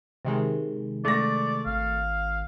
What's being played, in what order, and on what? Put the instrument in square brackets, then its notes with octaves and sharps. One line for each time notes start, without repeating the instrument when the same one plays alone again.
[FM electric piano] C3 D#3 G#3
[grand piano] A3 A#6 [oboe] D5
[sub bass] G#1 [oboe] F5